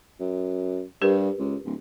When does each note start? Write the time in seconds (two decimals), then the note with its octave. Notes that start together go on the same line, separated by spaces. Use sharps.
0.20 F#2
1.02 G2 G4 A#4 B4
1.39 C#2
1.65 D1